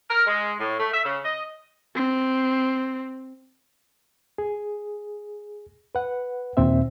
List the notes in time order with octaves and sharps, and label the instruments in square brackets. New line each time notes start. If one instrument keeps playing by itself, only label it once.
[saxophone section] A#4
G#3
A2
A3
E5
C#3
D#5
[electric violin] C4
[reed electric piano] G#4
B4 F#5
D#2 A#2 C4 E5